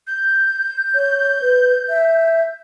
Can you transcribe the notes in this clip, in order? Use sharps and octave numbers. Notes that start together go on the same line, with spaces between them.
G6
C#5
B4
E5